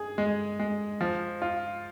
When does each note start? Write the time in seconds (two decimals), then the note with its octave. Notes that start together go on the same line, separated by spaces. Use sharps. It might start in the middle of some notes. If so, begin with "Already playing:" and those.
Already playing: G#4
0.18 G#3
0.59 G#3
1.01 F3
1.42 F4